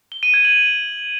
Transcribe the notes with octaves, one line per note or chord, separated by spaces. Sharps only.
G7
D#7
G#6
F#7